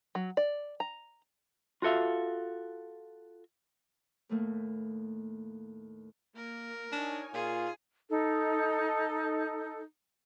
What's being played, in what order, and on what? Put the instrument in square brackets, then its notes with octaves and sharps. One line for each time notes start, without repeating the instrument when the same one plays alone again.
[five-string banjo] F#3
D5
A#5
[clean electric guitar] F4 F#4 A4 E5 F5
[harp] D#2 A2 A3 A#3
[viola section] A#3 [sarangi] A#4
[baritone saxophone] D4 [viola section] D#4 C#5 G#5
[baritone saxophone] A#2 [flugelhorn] F4 [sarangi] G#4
[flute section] D#4 A4